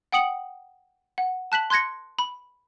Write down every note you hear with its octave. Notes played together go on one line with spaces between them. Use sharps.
F#5 G5 D#6 C#7 F#7
F#5
A5 F#6 B6 F#7
C6 F#6 G#6 A#6 C#7
B5